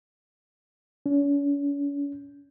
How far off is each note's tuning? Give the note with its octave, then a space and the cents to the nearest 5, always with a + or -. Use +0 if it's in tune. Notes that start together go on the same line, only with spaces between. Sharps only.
C#4 +40